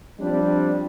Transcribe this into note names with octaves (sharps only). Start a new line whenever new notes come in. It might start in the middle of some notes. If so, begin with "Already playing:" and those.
F3 G3 C4 D4